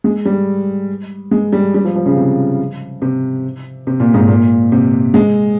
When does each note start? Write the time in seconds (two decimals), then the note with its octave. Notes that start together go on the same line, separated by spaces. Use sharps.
0.04 G#3
0.25 G3
1.31 G#3
1.53 G3
1.74 G3
1.84 F3
1.95 F3
2.06 C#3
2.17 C3
3.02 C3
3.87 C3
4.00 A#2
4.14 G#2
4.28 A#2
4.72 C3
5.14 G#3